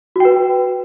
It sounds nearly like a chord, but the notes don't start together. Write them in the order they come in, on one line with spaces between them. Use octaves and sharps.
F#4 G5 B4